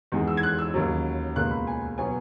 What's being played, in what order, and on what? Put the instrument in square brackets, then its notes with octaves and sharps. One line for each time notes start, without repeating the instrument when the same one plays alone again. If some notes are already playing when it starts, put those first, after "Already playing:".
[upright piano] E2 D#3 G#3 D#4
E6
G#6
F#6
E6
D#2 C#3 F#3
C#2 B2 A#3 F#6
B5
G#5
B2 F#3 B3 G#5